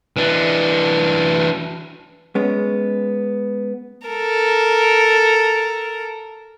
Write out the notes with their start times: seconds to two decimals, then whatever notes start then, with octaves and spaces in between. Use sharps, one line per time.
0.17 E3 D4
2.35 G#3 B3 C#4
4.08 A4 A#4